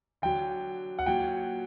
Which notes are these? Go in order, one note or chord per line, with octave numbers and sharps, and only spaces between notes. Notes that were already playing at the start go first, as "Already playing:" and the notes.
D3 F#3 G5
F#5
A#2 F#3 G5